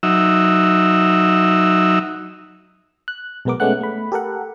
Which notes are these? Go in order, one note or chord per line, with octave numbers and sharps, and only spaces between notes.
F#3 D#4 E5
F#6
B1 B2 G#3 B3 A#4 D6
G#3 A3 B3 C#4 F#5 F#6
A3 B5
G4 A4 A#4 F#5